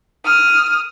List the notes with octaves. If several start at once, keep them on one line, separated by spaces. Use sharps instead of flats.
D#6 F6